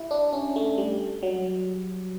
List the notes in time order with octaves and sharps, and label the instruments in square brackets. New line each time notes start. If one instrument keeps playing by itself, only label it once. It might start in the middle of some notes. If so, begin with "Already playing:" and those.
Already playing: [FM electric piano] E4 G4
D4
C#4
A3
G3
F#3